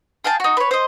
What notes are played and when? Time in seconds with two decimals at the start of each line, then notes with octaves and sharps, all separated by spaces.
0.24 G#4 F5 G5 A5
0.40 D#4 F#4
0.57 B4 C#5
0.71 C5 D#5